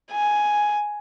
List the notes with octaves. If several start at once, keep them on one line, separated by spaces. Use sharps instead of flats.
G#5